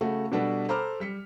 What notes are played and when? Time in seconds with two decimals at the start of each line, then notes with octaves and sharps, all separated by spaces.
0.01 C#3 A3 F#4
0.32 B2 G3 D4 F#4 A4 B4
0.68 A4 C5 A#5 B5 D6 F6
1.00 G3 B6 C#7